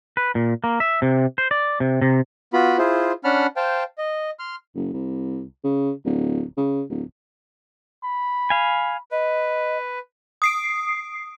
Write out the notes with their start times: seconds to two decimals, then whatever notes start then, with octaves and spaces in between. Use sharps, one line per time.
0.17 B4
0.35 A#2
0.64 A#3
0.80 E5
1.02 C3
1.38 C5
1.51 D5
1.80 C3
2.01 C3
2.53 B3 F4 F#4 B5
2.78 E4 F4 G#4 C5
3.24 C#4 D4 F#5 A5 B5 F6
3.56 C5 F5 G5 A5
3.98 D#5
4.39 C6 F6
4.75 F#1
4.93 C2
5.64 C#3
6.05 D1
6.57 C#3
6.90 D1
8.04 B5
8.50 F5 G#5
9.11 B4 D#5
10.42 D#6 C7 D7